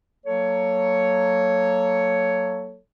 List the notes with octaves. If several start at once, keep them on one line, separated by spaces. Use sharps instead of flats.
F#3 A#3 A4 C#5